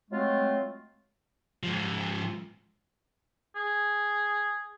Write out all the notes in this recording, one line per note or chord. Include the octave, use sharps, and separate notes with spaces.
F#3 G#3 A3 C4 F4
G#2 F3
G#4